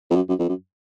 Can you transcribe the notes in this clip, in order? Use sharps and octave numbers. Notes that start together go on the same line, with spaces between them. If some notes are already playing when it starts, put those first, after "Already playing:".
F2
F#2
F#2
F2
F#2